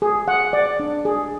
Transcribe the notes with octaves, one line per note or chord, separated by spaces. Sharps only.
G#4
F#5
D5
D4
G#4